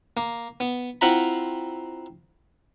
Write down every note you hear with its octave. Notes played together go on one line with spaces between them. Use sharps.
A#3
B3
C4 E4 F4 F#5 A#5 B5